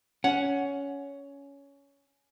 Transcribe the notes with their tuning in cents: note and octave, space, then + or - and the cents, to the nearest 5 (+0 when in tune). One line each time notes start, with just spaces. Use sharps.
C#4 +15 F#5 +0